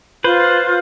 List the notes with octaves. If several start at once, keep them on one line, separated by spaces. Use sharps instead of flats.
F4 B4 C5